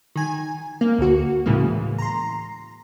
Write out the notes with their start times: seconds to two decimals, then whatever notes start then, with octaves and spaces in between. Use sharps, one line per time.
0.16 D#3 G#5
0.81 A#3
0.99 D2 F#4
1.46 A2 C#3 E3 G#3 A#3
1.98 A#5 C6